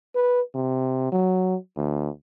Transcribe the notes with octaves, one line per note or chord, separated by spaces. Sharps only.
B4
C3
F#3
D2